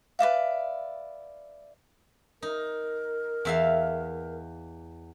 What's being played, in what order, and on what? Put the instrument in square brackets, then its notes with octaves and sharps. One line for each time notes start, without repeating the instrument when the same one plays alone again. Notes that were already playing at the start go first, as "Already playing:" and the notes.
[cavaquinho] B4 D5 E5 F5
[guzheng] D#4 [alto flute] A#4
[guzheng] E2 E5 F5